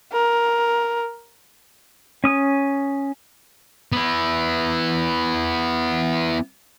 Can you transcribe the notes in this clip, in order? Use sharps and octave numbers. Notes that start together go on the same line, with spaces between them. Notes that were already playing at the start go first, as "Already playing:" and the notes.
A#4
C#4 D#6
B3 E4